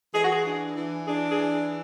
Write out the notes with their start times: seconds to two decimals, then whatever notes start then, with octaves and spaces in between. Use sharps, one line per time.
0.13 E3 G#4
0.22 F#4
0.30 G#4
0.45 D4
0.76 E3
1.06 D4 G#4
1.29 G#4
1.38 E3